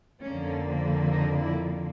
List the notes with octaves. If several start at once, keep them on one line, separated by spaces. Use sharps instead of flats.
F2 D3 F3 A#3 C#4
D#4
E4